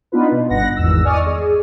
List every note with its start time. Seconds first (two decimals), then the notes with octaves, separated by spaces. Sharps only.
0.12 B3 D4 D#4 F4 B4
0.32 B2
0.50 G1 F#5 A#6
0.76 G#1 E2 E6
1.05 D5 D#5 G#5 C#6 D#6 F6
1.26 G#4